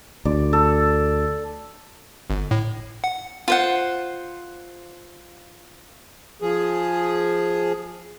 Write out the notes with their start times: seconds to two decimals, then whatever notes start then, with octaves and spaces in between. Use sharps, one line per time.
0.25 D2 D5
0.53 A4
2.30 G1
2.51 A2
3.04 F#5
3.48 F4 C5 F#5
6.42 F3 G#4